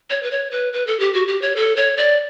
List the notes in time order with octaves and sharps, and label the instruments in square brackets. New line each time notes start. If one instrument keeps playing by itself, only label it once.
[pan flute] C#5
B4
C#5
B4
B4
A4
G4
F#4
G4
C#5
A4
C#5
D5